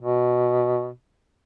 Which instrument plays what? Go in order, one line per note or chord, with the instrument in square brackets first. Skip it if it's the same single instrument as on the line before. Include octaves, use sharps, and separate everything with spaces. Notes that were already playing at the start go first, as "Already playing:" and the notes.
[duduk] B2